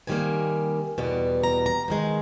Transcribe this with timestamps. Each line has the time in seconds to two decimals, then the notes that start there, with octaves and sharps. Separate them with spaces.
0.07 C3 D#3 G3 A#3 G#5
0.98 E2 B2 G3
1.44 A#5
1.66 A#5
1.88 G#2 D#3 G#3